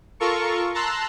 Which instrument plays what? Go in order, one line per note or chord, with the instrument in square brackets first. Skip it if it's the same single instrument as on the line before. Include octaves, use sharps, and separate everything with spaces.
[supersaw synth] F4 A4 A#4 C#6
A5 A#5 C6 E6 F#6